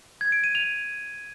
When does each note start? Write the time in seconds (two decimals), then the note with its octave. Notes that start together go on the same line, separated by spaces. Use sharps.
0.21 G#6
0.32 D7
0.44 D#7
0.55 F7